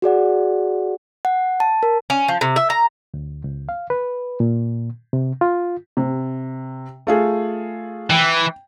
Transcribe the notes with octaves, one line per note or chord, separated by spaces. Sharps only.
F#4 G#4 D5 F#5
F#5
A5
A#4
C#4
F3
C3
E5
A#5
D2
C#2
F5
B4
A#2
C3
F4
C3
A3 F4 G#4
E3 G5